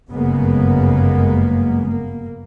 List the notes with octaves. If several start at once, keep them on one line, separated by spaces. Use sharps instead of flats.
G1 F#2 C#3 G#3 A#3 B3
A#3